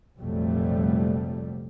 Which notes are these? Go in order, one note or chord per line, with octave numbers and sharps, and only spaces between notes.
F1 A#1 F2 F#3 G3 A3